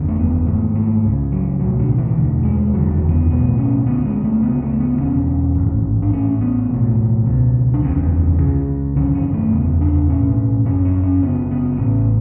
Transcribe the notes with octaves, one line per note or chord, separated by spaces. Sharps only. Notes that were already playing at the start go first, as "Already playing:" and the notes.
Already playing: F#1 E2 D3
A3
B3
G#1 G#2 A3
A3
C#2 C#3
F#3
A2 F#3
B1
D3
E3
E1 D2 D3
G#3
F#1 E2 D3 F#3
E3
B3
B1 A2 B3
C#4
D2 D3 B3
G#3
A3
D2 C#3 B3
A3
B3
E1 E2 D3 C#4
A1 G#2
D4
A1 A2 C#4
B3
B1 A2
C#2 B2
D4
F#1 E2 D3 C#4
C#2 C#3
G#1 F#2 D3 C#4
C#4
A3
F#1 E2 C#3 B3
D4
B1 A2 C#4
F#1 F#2 C#3 C#4
C#4
C#4
F#1 F#2 C#3 B3
B3
A1 A2 C#4